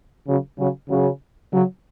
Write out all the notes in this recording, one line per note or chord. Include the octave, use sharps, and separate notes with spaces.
C#3 F#3
C#3 F#3
C#3 F#3
C#3 F#3